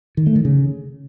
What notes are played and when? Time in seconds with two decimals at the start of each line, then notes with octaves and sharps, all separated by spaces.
0.17 D#3
0.26 A3
0.36 D#3
0.45 C#3